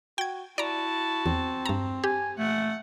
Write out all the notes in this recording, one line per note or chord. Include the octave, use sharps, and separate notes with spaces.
F#4 G5 G#6
E4 F#4 D5 A5 A#5
E2 C4
G2 A#5
G4 G#5
A#2 A3 F#5